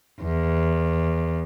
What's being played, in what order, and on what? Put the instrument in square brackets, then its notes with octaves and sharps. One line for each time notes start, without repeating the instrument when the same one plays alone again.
[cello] E2